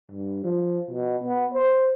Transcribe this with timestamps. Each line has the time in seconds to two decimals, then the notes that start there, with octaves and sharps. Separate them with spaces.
0.11 G2
0.44 F3
0.91 B2
1.24 B3
1.54 C5